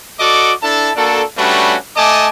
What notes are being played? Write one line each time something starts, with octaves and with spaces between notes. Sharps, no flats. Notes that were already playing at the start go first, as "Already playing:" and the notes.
F#4 A4 D5 D#5 D6
D4 E4 A4 A5
A#3 D4 F#4 A4
G3 A3 C#4 D4 F#4 B4
A3 D#5 G#5 A5 D6